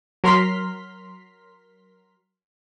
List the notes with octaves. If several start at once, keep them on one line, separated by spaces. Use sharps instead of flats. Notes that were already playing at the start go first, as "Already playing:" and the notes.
F#3 A#4 A#5 C6 F6 B6